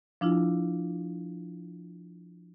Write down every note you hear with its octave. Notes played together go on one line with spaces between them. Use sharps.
F3 D4 E4 F4